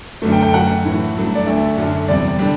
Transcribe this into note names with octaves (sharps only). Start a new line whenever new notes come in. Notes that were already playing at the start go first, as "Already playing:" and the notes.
F#2 D3 F#3 A3
G5
G5
F#2 F#3 A3 F#5
A2 E3 A3
G2 F#3 A3
D5
D2 D3 A3 E5
F#2 D3 F#3
E2 C3 G3 D5
D3 G3